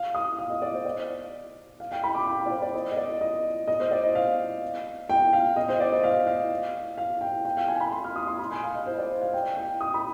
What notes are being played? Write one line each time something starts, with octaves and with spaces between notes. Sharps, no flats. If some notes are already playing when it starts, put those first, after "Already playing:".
Already playing: F5
D#6
F5
D#5
D5
C5
D5
F5
G5
B5
D6
G5
F5
D5
C5
D5
D#5
D#5
D5
D#5
D#5
C5
D5
D#5
F5
G5
F5
D#5
C5
D5
D#5
F5
F5
F5
G5
G5
F5
G#5
B5
C6
F6
D#6
C6
B5
G#5
F5
D#5
C5
D5
F5
G5
G5
D#6
B5